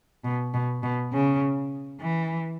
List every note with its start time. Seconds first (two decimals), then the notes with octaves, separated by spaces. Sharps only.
0.25 B2
0.54 B2
0.83 B2
1.13 C#3
2.01 E3